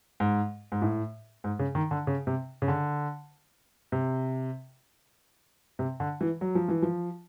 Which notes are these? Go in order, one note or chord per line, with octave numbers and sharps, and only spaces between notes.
G#2
G#2
A2
G#2
C#3
D#3
D3
C#3
C3
C#3
D3
C3
C3
D3
E3
F#3
F3
E3
F3